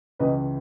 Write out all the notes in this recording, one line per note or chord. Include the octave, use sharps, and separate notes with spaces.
C#2 C#3 E3 B4 D#5